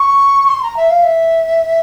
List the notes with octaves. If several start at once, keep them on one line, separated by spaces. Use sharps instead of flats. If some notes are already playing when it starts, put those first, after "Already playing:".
Already playing: C#6
C6
A#5
E5
F5
E5